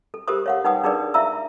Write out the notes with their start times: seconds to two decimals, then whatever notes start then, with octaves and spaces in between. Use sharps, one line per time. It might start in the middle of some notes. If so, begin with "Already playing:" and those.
0.14 A4
0.28 G4 A4 A#4 C5 D#6
0.46 C#5 F5 F#5
0.64 D#4 B4 F#5 G5 D#6
0.84 D4 D#4 G#4 A#4 B4 D5
1.14 E4 E5 F5 A#5 E6